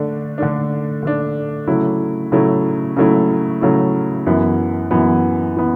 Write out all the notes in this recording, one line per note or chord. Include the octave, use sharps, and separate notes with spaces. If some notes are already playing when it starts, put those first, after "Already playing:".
Already playing: D3 A3 D4
D3 A3 D4
D3 A3 D4
C#3 F#3 A3 E4
C#3 F#3 A3 E4
C#3 F#3 A3 E4
C#3 F#3 A3 E4
F#2 E3 B3
F#2 E3 B3
E3 B3